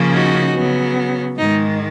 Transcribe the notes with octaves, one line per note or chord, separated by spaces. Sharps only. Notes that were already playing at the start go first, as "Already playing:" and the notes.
Already playing: C#3 F3 A#3 C#4
D#4 F#4
C#3 F#3 B3
G#2 D#3 G#3 D#4